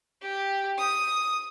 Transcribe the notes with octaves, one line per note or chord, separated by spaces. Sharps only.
G4
D#6